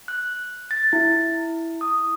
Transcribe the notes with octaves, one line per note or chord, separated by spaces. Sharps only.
F#6
A6
E4
D#6